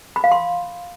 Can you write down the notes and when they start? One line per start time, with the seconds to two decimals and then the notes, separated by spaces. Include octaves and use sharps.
0.16 B5
0.24 F5
0.32 C6